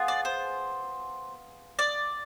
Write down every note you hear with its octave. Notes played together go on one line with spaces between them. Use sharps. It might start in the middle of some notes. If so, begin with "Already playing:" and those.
Already playing: B3 F4 G#4
D5
C5
D5